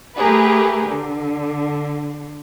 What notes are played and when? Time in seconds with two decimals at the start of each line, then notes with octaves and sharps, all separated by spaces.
0.18 A3 G4 G#4 A#4 B4
0.89 D3